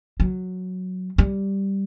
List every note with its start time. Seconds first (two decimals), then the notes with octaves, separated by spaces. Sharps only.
0.20 F#3
1.18 G3